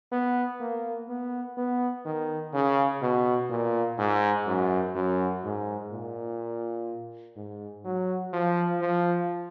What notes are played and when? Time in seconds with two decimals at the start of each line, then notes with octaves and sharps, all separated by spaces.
0.12 B3
0.60 A#3
1.09 B3
1.57 B3
2.05 D#3
2.53 C#3
3.02 B2
3.50 A#2
3.98 G#2
4.46 F#2
4.95 F#2
5.43 G#2
5.92 A#2
7.36 G#2
7.84 F#3
8.33 F3
8.81 F3